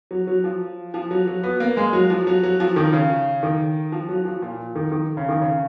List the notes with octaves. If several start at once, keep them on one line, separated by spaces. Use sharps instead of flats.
F#3
F#3
F3
F3
F#3
F#3
B3
A#3
G#3
F#3
F3
F#3
F#3
F3
D#3
C#3
D#3
F3
F#3
F3
A#2
D#3
D#3
C#3
D#3
C#3